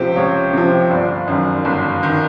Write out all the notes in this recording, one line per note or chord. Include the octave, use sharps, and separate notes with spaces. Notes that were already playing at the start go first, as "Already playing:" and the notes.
Already playing: C#2 C3 F3 G4 C5
C#2 C#5
C3 F3
G1 D5
F#2 D#3
G1
D#3